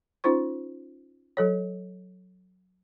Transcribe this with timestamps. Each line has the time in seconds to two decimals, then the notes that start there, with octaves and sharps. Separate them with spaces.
0.24 C#4 D#4 F4 C5 C#6
1.37 F#3 A4 C#5